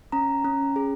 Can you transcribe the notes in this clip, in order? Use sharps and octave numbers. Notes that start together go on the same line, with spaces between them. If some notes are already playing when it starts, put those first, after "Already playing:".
C#4 A#5
C#4
G#4